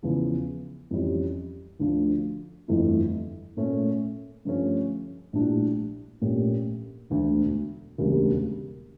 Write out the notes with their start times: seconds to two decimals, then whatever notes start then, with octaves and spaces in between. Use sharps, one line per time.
0.03 E2 C#3 F3
0.91 F2 E3 G3 C#4 E4
1.79 D2 D3 F3
2.68 G1 F2 E3 A3 E4
3.57 A#2 A3 C#4
4.45 G2 D3 F3 A3 C#4
5.33 A#1 A2 G3 D4 G4
6.21 A#1 A#2 A3 C#4 G4
7.10 E1 D2 D3
7.98 E1 D2 C#3 G3 A#3